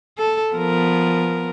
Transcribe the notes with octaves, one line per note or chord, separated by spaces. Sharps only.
A4
F3 B3 A#4